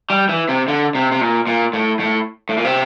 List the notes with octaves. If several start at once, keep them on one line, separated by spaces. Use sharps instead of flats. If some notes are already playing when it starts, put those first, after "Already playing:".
G3
E3
C3
D3
C3
C3
A#2
A#2
A2
A2
A2
A#2
C3